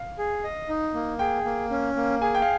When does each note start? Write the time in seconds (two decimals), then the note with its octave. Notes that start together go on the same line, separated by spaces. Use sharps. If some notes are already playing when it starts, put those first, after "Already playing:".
Already playing: F5
0.18 G#4
0.44 D#5
0.69 D#4
0.94 A#3
1.19 G#4 G5
1.45 A#3
1.71 C#4
1.96 A#3
2.22 G#4 G#5
2.35 G5
2.42 F5